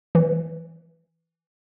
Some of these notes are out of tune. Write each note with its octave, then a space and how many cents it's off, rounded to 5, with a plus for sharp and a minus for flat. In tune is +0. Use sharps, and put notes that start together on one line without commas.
E3 +5